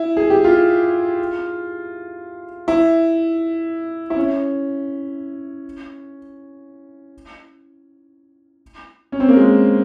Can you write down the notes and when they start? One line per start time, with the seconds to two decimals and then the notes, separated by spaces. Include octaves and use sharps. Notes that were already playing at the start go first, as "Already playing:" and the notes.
Already playing: E4
0.17 G#4
0.30 G4
0.44 F4
2.68 E4
4.10 E4
4.16 C#4
9.12 C#4
9.20 C4
9.29 A#3
9.37 G#3